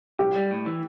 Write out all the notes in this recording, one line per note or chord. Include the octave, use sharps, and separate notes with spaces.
B1 G4
G3
A2
E3